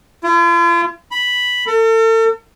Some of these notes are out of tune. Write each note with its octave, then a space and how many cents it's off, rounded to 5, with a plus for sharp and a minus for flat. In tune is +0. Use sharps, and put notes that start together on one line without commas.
F4 -45
B5 -5
A4 +40